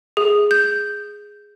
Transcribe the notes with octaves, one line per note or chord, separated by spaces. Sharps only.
G#4
G6